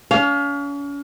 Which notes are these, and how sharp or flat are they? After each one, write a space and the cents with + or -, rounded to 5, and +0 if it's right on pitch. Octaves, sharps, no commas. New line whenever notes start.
C#4 +40 F5 +0